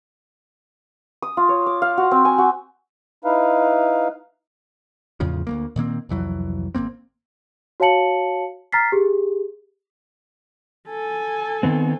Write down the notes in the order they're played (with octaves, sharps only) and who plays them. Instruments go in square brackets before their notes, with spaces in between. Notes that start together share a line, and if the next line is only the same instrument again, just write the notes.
[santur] D#6
F4
C#5
D6
F5
F#4
C4
G#5
F#4
[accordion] D#4 E4 B4 F5
[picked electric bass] E2 A2 C#3 F3
D2 G3 A#3
A#2 D#3 A#3 C4
C2 F2 E3 F#3
G#1 G#2 A#3 C4
[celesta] F#4 C#5 F5 A5 C#7 F#7
A#5 F6 A6 B6 C7
G4 G#4
[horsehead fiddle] A4 G#5
[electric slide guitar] D#3 B3 C4